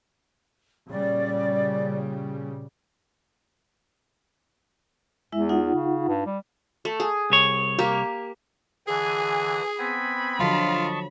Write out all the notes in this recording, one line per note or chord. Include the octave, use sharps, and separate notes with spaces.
A#2 C#3 G3 D5
E2 G#3 E4 E5
D#4 F4 F#5
C#3
G2
G3
A3
G#4
C2 C#5
A#3 G4
D3 E3 G#4 G#5
B3 C4 G#5 B5
D3 F3 F#3 F4 D#5 A5 C#6